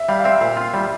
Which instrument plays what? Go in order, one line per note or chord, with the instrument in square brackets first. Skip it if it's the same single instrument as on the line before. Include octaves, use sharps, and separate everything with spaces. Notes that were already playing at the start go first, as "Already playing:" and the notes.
Already playing: [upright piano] E5
[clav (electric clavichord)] G3 [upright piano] F5
[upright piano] F5
[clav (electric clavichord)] C4 [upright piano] E5
[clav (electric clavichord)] A#2 [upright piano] F5
[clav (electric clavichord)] F4
G3